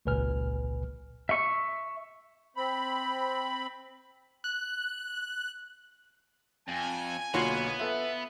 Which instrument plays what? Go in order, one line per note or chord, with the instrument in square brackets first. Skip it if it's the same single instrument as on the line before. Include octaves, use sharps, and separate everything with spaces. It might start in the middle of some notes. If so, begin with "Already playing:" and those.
[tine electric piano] G#1 C#2 A#2 B4 G#5 F6
[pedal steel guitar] E5 C#6
[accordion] C4 B5
[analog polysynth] F#6
[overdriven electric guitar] F2 [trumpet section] G#5
[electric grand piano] B1 D3 C#5 [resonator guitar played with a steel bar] A#3 F4 F#4 [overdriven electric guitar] B3
[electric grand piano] F4 A4 B4 [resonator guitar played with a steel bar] E5